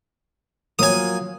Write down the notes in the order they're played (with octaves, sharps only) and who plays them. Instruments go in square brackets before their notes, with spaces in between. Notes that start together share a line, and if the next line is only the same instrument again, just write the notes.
[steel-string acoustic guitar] F3 F#3 A#3 [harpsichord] G#5 D#6